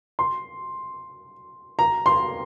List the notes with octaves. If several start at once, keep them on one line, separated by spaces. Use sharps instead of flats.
C6
A#5
C6